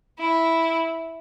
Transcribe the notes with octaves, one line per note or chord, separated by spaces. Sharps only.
E4